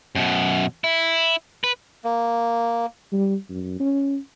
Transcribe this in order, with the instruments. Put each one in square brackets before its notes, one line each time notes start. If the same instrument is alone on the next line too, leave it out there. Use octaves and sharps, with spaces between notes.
[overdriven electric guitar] F#2 B2
E4
B4
[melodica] A#3
[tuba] G3
F#2
C#4